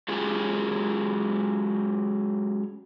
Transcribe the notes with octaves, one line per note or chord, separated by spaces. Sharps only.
F#3 G#3 C#4 F4 G4 G#4